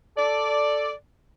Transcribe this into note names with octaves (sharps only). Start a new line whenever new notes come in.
A4 D5